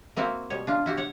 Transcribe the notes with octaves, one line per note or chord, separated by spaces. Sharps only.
A#3 C4 E4 F#4 B4
B2 G3 C#5
D4 F4
E4 F#4 G4
C#5 F#5